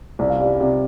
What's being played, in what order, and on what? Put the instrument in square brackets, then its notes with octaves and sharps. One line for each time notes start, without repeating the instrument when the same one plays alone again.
[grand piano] C2 [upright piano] D5
[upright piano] F5
[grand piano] G3 [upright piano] D5
[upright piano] F5
[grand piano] C3 [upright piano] D5